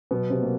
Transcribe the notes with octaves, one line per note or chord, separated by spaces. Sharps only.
B2 F#3 B3
C3 C4
A#3